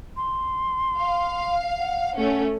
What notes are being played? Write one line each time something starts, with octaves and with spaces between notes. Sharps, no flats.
C6
F5
F#5
A3 C#4